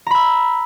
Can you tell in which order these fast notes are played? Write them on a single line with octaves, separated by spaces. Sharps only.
A#5 B5 E6